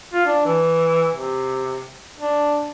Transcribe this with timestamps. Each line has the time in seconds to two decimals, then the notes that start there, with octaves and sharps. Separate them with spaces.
0.13 F4
0.26 D4
0.46 E3
1.14 C3
2.19 D4